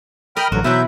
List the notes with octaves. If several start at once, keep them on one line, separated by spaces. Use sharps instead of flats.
A#4 D#5 G5 B5 F6
A1 G2 D3 F#3 F#4
B2 E3 F#3 C4 E4 B4 G6